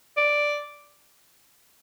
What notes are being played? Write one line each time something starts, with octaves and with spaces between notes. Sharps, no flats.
D5